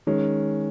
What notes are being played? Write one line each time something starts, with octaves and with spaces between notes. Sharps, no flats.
D#3 G#3 C#4